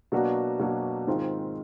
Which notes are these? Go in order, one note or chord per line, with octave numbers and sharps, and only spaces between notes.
B2 F#3 A#3 D4 F#4
B2 F#3 A#3 D4 F#4
G#2 D#3 G#3 C4 F4